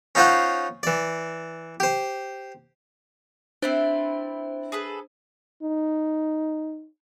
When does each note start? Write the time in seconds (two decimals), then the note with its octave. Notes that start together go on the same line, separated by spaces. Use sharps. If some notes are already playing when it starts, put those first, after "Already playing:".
0.15 C#4 D#4 F4 C5 C#5 F#5
0.83 E3 D5
1.80 G4 C5
3.62 C4 D4 E4 B4 C5
4.72 G#4 A4 B4
5.62 D#4